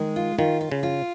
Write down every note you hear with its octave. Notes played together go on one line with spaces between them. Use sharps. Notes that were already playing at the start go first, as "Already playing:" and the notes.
Already playing: D#3 G#3
F4
D#3 F4
F4
C#3
F4